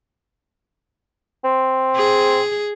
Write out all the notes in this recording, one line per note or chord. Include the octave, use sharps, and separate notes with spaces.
C4
G#4